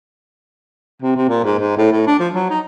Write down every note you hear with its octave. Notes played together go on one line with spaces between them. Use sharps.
C3
C3
A#2
G#2
G#2
A2
A2
D4
F3
F#3
D#4